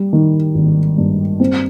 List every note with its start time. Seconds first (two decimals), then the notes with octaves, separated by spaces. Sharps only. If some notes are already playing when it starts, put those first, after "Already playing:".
Already playing: G3
0.13 D#3
0.55 G#1
0.98 G2
1.40 C4